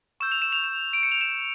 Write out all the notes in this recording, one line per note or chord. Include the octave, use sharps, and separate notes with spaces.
C#6 E6 G6 E7
F7
E7
F7
E7
D7
C#7
F7
E7